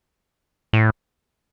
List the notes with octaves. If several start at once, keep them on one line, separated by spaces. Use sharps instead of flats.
A2